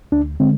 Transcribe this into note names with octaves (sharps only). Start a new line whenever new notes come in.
D2 D4
D3 G#3 C4